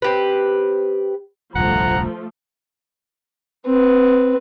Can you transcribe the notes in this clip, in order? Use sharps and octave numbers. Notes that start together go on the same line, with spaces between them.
C4 G4 B4
D#1 C2 G2 F3 A3 F#5 A#5
C4 B4